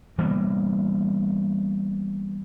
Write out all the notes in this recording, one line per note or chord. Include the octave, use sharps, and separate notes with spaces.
E3 G3 A#3 B3